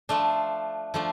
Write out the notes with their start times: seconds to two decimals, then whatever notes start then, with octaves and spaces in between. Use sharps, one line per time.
0.09 F3 A3 D4
0.94 F3 A3 D4